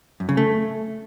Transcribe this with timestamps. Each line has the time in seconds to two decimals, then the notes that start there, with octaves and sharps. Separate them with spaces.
0.20 F#2
0.29 C#3
0.37 A3